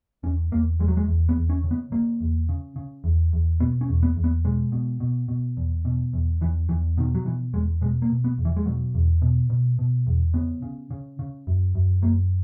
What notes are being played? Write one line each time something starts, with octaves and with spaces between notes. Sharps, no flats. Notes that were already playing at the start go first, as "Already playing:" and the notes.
E2 C#4
E2 A#3
E2 G#3
F#3
G#3
E2
B3
E2
C#4
C#3
B3
C#3 A#3
E2
C#3
C#3
E2
E2
B2 B3
C#4
E2
B3
E2
B3
B2 G#3
B2
B2
B2
E2
B2
E2
E2 E3
E2 E3
B2 D#3
F#3
B2 E3
E2 G#3
B2 G#3
A#3
B2
B3
E2
E3
G#3
B2 F#3
E2
B2
B2
B2
E2
C#3 B3
C#3
C#3
C#3
F#2
F#2
F#2 A#3